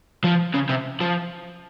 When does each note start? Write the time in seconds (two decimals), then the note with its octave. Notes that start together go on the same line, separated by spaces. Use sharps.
0.24 F3
0.54 C#3
0.70 C3
1.01 F3